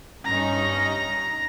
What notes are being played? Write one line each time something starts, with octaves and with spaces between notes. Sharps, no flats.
G2 C#4 D#4 A#5